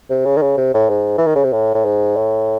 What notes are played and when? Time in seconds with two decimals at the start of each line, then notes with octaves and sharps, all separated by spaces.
0.10 C3
0.25 C#3
0.37 D#3
0.42 C#3
0.58 C3
0.74 A2
0.90 G#2
1.18 E3
1.26 D#3
1.35 C#3
1.44 C3
1.53 A2
1.74 A2
1.85 G#2
2.16 A2